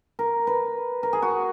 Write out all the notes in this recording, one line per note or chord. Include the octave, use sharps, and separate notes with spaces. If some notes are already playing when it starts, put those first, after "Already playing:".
A#4
B4
A#4
G#4
F#4